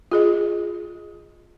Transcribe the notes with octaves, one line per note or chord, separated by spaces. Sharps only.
F4 G#4 D#5